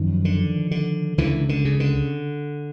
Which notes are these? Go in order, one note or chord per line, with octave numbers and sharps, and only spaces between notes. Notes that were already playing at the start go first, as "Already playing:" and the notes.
Already playing: F#2 D#3 F3
D3
D3
C#2 D3 E3
D3
C#3
D3